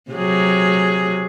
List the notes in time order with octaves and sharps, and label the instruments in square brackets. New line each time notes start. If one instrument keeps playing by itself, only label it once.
[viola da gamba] C3 F#3 G#4